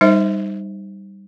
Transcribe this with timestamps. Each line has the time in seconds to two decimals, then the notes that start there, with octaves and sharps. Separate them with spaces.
0.01 G3 D#4 C5 E5